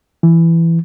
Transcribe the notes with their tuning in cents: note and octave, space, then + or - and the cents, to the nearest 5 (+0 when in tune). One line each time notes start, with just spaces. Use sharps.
E3 +10